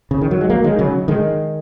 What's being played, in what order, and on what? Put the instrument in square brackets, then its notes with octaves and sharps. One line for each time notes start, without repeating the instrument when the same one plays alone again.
[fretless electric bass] C#3
D#3
F#3
G#3
F#3 A#3
D#3 G#3
C#3 F#3
D#3 G#3